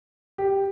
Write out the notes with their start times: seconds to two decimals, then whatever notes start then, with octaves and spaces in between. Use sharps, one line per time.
0.38 G4